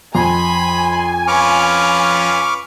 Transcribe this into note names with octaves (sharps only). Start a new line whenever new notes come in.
F2 G#5 B5 C6
C#4 F4 B4 C#6 D6 F6